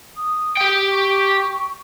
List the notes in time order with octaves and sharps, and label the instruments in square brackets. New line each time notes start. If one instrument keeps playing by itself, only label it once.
[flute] D#6
[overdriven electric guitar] G4 G5
[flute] C#6